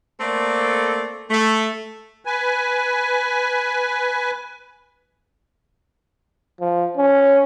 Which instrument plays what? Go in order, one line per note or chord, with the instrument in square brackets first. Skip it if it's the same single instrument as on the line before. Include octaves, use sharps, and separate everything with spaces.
[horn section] A3 A#3 C4 A4 D5
A3
[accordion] B4 G#5
[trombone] F3
C#4